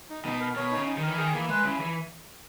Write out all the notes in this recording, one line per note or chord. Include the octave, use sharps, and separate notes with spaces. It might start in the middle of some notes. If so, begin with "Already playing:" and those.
D#4
B2 D#4
A#4
B2 C#5
D#4
C#3
D#4
D#3
A#4
E3
D#3 G#4
E3 A#3
G#3 B4
C#3 E4
E3